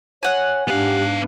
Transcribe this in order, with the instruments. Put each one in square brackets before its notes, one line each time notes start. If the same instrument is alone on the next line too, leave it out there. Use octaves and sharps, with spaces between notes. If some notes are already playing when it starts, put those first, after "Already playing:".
[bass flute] C#5 [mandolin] F#5 G#5
[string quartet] G#2 D4 F#6 [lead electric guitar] B3 F5 [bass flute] G4